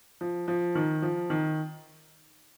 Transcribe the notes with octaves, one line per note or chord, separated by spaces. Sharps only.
F3
F3
D#3
F3
D#3